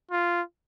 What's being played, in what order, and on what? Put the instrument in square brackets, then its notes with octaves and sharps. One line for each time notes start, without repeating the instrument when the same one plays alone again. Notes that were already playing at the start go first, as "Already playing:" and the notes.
[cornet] F4